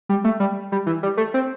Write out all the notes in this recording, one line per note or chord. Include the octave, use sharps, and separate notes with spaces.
G3
A3
G3
G3
E3
G3
A3
C4